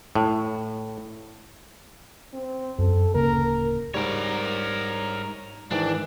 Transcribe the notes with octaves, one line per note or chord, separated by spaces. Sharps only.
A2
C4
F#2 A4
D1 C#3 A#3 A#4
G#2 G3 A#4 C#5
G#2 D#3 E3 D4